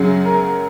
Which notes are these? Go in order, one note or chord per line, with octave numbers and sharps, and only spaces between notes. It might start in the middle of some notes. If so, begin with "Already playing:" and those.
Already playing: F#2 C#3 F#3 G#4
A#4